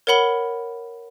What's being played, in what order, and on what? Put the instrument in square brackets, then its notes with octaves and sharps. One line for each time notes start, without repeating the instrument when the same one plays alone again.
[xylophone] A#4 C#5 F#5 B5 G7